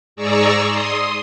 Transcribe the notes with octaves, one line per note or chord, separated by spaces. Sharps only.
G#2 G#4 D5 A#5 C#6 E6
C6 D#6